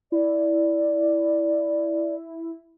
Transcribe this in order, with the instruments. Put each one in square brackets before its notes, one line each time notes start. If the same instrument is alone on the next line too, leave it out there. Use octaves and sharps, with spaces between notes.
[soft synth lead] E4 [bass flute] D5